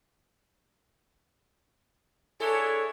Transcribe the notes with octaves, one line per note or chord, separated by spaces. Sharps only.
D4 E4 G#4 A4 C#5